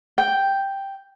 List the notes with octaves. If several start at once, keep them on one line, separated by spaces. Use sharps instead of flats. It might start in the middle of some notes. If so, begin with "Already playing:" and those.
G5